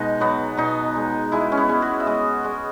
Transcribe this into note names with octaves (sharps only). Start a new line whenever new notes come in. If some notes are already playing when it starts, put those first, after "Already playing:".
Already playing: B2 G#3 D#4
F#3 B3
B2 D#4
G#3
G#3 E4
C#4
B3
G#3
F#4
E5
G#3 D#5
G#3